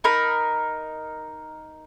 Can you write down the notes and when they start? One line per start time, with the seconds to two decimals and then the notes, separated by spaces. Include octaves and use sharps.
0.04 D#4 A#4 B5